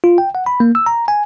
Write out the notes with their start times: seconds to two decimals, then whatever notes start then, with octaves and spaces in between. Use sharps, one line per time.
0.04 F4
0.18 G5
0.35 F#5
0.46 B5
0.60 A#3
0.75 E6
0.86 A#5
1.08 G#5